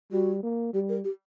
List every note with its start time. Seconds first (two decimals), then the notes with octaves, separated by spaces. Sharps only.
0.12 G3 F#4
0.43 A#3
0.74 G3 G4
0.89 A#4
1.04 G4